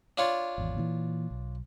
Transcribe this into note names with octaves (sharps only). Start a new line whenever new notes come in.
D4 F4 C#5
G#1 E2
A#2 D3 E3
B1